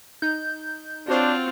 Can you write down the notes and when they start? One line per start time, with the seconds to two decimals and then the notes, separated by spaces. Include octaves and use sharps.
0.22 D#4 G6
1.08 C4 D4 F4 F#4 C5 C#5